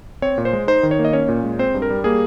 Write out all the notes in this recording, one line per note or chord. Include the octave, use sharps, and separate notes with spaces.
C4 C#5
A#2
C5
G#3
D#4 C5
D#3
C#5
A#3
D#5
C#4 C#5
A#2
G#3
C4 C5
G2
A#4
G3
A#3 G#4